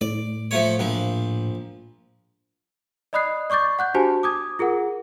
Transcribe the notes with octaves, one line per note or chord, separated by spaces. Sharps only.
A2 D5
F3 A3 C#5
A#1 F3
D5 D#5 B5 D#6 F#6 C7
D5 C#6 D6 G6 A6
F#5 F#6 G6
D4 F#4 G4 C5 G#5 A5
D6 D#6 G#6
F4 G#4 A#4 F#5